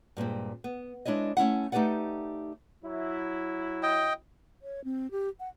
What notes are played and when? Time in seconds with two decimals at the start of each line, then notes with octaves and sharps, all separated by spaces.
0.17 G2 A#2 G#3 C4
0.64 B3
1.05 G#3 D4 E4 C#5 D#5
1.37 A3 C#4 E4 F#5
1.72 A3 D#4 G4 B4 D5 F#5
2.85 F#3 E4
3.83 D#5 G5
4.62 C#5
4.84 C4
5.11 G4
5.40 F#5